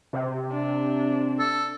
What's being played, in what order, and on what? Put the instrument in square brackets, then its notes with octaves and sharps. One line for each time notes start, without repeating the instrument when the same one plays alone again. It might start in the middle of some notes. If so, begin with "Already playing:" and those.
[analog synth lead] C3
[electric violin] D4
[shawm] A4